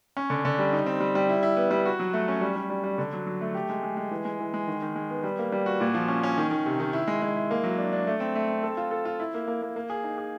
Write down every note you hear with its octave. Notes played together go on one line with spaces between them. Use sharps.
C#4
D3
D3
G3
D#4
C4
G3
G3
E4
E4
B3
G3
F#4
F#3
A3
C#4
G3
G3
G3
G3
D3
F#3
F#3
A3
G4
G#3
G#3
G#3
E3
G#3
E3
G#3
D#3
D#3
G#3
B3
G3
A#3
G3
F#4
A#2
F3
C#4
C#4
D#3
D#3
C3
D#3
E4
G#3
G#3
E4
A#3
F#3
D4
D4
A3
C4
A3
C4
A4
F4
A4
F4
E4
A#3
A#3
A#3
A#3
G#4
D#4
G#4